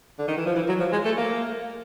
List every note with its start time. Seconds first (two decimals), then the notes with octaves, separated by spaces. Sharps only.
0.19 D3
0.28 D#3
0.37 E3
0.46 F3
0.56 E3
0.68 F#3
0.80 F3
0.92 G#3
1.05 A3
1.17 A#3